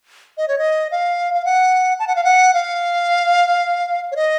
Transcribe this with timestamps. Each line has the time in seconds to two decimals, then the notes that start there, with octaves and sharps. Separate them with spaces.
0.38 D#5
0.48 C#5
0.58 D#5
0.91 F5
1.34 F5
1.45 F#5
1.99 A5
2.07 F#5
2.16 F5
2.24 F#5
2.54 F5
4.12 C#5
4.16 D#5